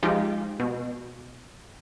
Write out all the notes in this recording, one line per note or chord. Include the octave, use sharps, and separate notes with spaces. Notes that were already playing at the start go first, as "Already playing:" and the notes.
F3 G#3 D#4 F4 G4
B2